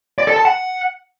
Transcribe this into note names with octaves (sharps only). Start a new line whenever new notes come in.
D5
A4
A5
F#5